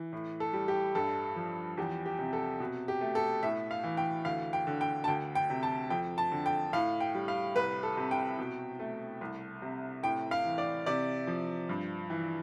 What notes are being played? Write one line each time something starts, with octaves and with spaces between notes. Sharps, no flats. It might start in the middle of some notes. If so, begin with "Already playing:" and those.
Already playing: E3
A2
A4
G3
G4
G2 A4
F3
E2 G4
G4
C3
A4
B2
G4
A3
A4
A2 E5
F5
E3
G5
D2 F5
G5
D3
G5
A5
D2 G5
G5
C3
A5
F2 G5
A5
D3
G5
A2 F5
G5
G3
F5
C2 B4
A4
C3
G5
B2
A3
C2
C3
A2 G5
F5
E3
D5
C3 D5
F3
G2
E3